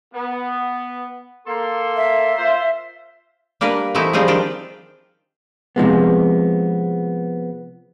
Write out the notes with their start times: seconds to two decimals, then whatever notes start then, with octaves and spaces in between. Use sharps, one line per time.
0.14 B3
1.47 A#3 A4 C6
1.97 E5
2.38 F4 C5
3.61 G3 A#3 D4 A#4 B4
3.95 E3 A3 C4 D#4 E4
4.13 F3 G3 C4 D#4 F4 G#4
4.28 D#3 D4 F4 G4
5.76 C3 F3 G#3 B3